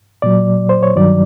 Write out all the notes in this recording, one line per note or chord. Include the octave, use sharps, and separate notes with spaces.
A#2 F#3 D5
C5
C#5
G2 D#3 F#3 D5